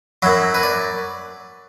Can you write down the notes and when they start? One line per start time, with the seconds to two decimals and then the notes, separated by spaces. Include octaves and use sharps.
0.22 F#2 F#3 E4
0.54 B4
0.63 D5